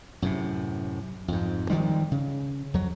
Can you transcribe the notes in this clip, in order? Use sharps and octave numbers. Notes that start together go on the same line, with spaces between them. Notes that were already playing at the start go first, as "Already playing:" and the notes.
F#2 A2 C3
F2 G#2
D#3 F3 G3 G#3
C#3
F2 F#3